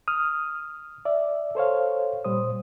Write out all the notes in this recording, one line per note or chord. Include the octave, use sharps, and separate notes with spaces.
D#6 F6
D5 E5
A4 C5 C#5 F5
A#2 G3 C5 D#6